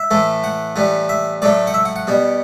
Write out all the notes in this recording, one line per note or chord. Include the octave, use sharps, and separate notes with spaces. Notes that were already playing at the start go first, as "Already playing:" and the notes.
Already playing: E5
A2 E3 A3
F#5
A2 E3 G3
E5
A2 F#3 A3 D5
F#5
E5
F#5
F#5
B2 G3